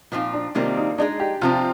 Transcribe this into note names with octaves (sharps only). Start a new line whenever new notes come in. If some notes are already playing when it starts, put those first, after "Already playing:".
A#2 F3 C4 D#4 F4
D4
C3 D#3 G3 A#3 C4 F4
D#4
G#3 D4 D#4 G#4
G4
C3 F3 C4 F4